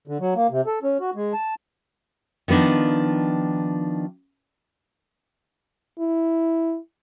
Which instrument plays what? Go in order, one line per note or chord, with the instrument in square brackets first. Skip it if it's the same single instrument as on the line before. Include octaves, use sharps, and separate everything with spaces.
[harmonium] D3
F#3
A#3
C3
A4
C#4
F#4
G#3
A5
[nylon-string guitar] D#3 F3 B3 D4 D#4
[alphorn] E4